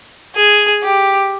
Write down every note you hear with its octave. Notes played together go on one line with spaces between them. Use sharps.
G#4
G4